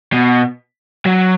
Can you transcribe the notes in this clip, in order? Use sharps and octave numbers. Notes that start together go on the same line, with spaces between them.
B2
F#3